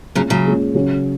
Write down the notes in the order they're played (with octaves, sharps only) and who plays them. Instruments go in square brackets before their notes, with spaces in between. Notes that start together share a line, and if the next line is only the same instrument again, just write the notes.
[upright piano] A#2 G#3 C#4 [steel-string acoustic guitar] C#3 F#3
[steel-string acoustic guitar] C#3 F#3
[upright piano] A#2 G#3 C#4
C#3 F#3 C#4